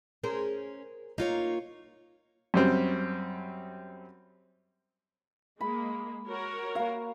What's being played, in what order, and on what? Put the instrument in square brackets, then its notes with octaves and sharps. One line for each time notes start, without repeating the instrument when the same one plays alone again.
[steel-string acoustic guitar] C#4 [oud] G#4 A#4 C5
[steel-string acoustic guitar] A#3 F4 C#5 [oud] D#4
[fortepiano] F#2 G3 C4
[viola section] G#3 A#3 [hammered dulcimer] B5
[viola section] F#4 A#4 C#5
[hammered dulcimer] A#3 F5